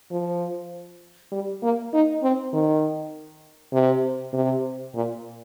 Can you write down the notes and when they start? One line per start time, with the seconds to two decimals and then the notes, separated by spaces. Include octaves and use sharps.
0.11 F3
1.32 G3
1.63 A#3
1.93 D#4
2.23 C4
2.54 D#3
3.73 C3
4.33 C3
4.95 A#2